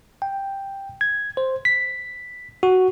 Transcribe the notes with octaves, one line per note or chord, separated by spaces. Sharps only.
G5
G#6
C5
B6
F#4